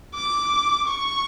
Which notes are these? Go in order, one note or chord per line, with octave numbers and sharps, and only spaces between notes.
D6
C#6